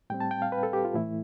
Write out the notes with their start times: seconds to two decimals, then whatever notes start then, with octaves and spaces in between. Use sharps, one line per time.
0.10 A2 G3 C4 G5
0.20 A5
0.31 G5
0.42 F5
0.52 B4
0.63 A4
0.73 G4
0.85 F4
0.95 A2 E3 A3 E4